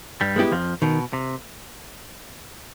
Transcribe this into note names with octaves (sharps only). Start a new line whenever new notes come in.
G2 G3
G#3 B3 E4 G4
F2 F3
B2 D#3
C3